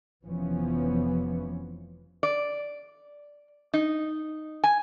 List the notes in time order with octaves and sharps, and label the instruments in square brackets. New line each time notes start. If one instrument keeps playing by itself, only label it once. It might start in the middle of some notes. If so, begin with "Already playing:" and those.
[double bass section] F1 E3 F3 B3 C#4
[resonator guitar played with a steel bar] D5
D#4
G#5